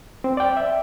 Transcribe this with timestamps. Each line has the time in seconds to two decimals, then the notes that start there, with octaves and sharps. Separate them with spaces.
0.24 C4
0.37 D5 G5
0.57 E5